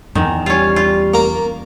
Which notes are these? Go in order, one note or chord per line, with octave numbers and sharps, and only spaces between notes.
E2 D#3
G3 C#4 F4
F4
A#3 A#4